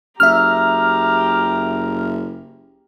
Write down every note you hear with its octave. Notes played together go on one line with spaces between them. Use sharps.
F#1 G4 E5 A#5 F6